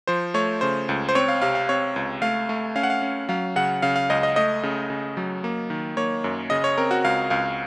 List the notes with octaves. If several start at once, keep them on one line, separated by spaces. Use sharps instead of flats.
F3 C5
A3 C#5
C#3 C5
C#2
C5
C4 C#5
F5
C3 F5
F5
C4 C#5
C#2
A3 F5
A3
C#4 F5
F#5
F5
C#4
F#3 F5
C#3 F#5
C#3 F5
F5
C#2 D#5
D#5
A3 D#5
C#3
C#3
F#3
A#3
D#3
A#3 C#5
F#2
C#3 D#5
C#5
C4 A#4
F#4
C#2 F5
C#2 F5